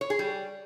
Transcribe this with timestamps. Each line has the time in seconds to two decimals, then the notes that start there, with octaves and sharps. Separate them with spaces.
0.01 C#5
0.10 G#4
0.19 G3